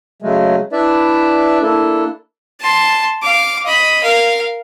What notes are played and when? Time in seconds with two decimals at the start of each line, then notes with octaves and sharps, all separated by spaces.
0.22 C#3 F#3 G#3 A3
0.73 D4 E4 B4 D5 E5
1.62 A#3 D4 E4 A4
2.60 A5 C6
3.22 F5 D6
3.66 D#5 B5
4.03 A#4 F5